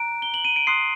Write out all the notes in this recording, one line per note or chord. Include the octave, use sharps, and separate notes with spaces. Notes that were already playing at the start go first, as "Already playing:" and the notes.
Already playing: A#5 F#6 D7
G7
F#7
D#7
D7
C6 D#6 F#6 C7